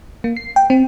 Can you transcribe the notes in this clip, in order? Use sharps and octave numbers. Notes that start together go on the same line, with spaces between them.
A#3
C7
G5
C4